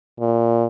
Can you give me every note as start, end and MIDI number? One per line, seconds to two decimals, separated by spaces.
0.20 0.67 46